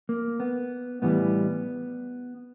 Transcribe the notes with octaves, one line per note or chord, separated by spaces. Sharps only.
A#3
B3
A2 E3 G3 B3